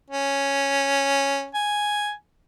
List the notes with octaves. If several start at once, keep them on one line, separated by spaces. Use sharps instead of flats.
C#4
G#5